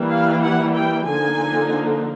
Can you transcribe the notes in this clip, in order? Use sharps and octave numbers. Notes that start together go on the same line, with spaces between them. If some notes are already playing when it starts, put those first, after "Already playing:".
Already playing: E3 G3 A#3
F5
F#5
G5
D3 F3 A#3 D#4 G#5